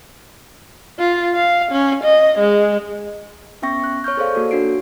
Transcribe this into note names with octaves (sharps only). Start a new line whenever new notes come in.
F4
F5
C#4
D#5
G#3
B3 C#4 E5 G5 C#6 A#6
F#6
C#5 C#6 F6 G6
G#4 A4 C5 D5 F5
A#3 F#4 A4
D4 F#4 C#5 C7 D7